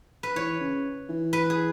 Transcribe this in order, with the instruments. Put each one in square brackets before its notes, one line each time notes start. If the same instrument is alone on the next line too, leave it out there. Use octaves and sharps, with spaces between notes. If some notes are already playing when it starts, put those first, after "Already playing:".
[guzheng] B4
[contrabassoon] E3 [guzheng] C#5
[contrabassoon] C#3
E3
[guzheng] B4
G#4